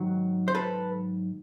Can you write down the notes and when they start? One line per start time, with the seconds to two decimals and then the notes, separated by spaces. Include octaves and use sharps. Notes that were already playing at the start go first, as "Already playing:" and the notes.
Already playing: G#2 D#3 F#3
0.48 C5
0.55 A4 B4